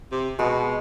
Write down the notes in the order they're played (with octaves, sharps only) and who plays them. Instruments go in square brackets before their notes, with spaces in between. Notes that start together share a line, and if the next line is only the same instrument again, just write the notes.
[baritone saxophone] C3
[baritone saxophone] B2 [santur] G#3